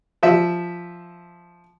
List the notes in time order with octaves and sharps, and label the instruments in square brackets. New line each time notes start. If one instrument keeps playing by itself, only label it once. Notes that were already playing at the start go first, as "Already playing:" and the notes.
[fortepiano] F3 E5